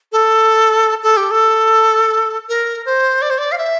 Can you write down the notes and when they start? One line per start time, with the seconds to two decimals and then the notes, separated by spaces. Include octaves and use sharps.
0.12 A4
1.03 A4
1.17 G4
1.31 A4
2.49 A#4
2.86 C5
3.22 D5
3.30 C5
3.38 D5
3.52 F5
3.58 E5